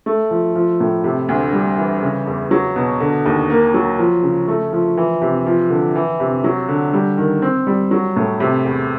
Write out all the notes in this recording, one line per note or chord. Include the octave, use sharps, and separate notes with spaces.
A3
F3
F3
A2
C3
D2
G3
E3
C#3
E2
F#3
B2
D3
D#2
A#3
F#3
F3
C#3
A3
F3
E3
C3
F3
D3
E3
C3
F#3
D3
G3
D#3
C4
G3
F#3
A2
C3
E2